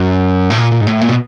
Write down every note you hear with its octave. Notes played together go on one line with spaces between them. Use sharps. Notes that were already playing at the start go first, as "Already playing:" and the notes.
Already playing: F#2
A2
A#2
A#2
G#2
A2
A#2
B2